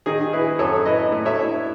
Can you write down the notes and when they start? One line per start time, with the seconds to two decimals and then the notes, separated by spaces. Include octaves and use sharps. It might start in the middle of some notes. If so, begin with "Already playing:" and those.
0.06 D#3 G#4
0.33 E4 G#4 B4
0.59 F#2 A4 C#5
0.85 E4 B4 D#5
1.12 A3
1.25 C#5 E5
1.39 E4